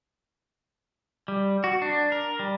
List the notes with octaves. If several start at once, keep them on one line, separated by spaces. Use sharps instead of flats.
G3
F#4
D4
A#4
G3